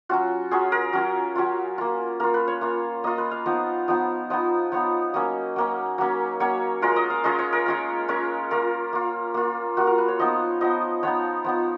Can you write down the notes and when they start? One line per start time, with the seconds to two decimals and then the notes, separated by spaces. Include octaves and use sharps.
0.09 F#3 C#4 F4 F#4
0.51 F#3 C#4 F4 G#4
0.72 A#4
0.93 F#3 C#4 F4
1.35 F#3 C#4 F4
1.78 A#3 F4
2.20 A#3 F4 A#4
2.34 B4
2.48 C#5
2.61 A#3 F4
3.04 A#3 F4 D#5
3.18 B4
3.31 F5
3.46 F3 B3 D#4 D#5
3.88 F3 B3 D#4 D#5
4.30 F3 B3 D#4 D#5
4.72 F3 B3 D#4 C#5
5.14 F#3 A#3 C#4 D#5
5.56 F#3 A#3 C#4
5.98 F#3 A#3 C#4
6.40 F#3 A#3 C#4 C#5
6.82 G#3 C#4 F4 A#4
6.96 D#5
7.10 F5
7.24 G#3 C#4 F4 D#5
7.39 C#5
7.53 A#4
7.66 G#3 C#4 F4
8.08 G#3 C#4 F4 A#4
8.51 A#3 F4 A#4
8.93 A#3 F4
9.34 A#3 F4
9.77 A#3 F4 F#4
9.87 A#4
9.98 B4
10.08 C#5
10.19 F3 B3 D#4 D#5
10.61 F3 B3 D#4 D#5
11.03 F3 B3 D#4 C#5
11.44 F3 B3 D#4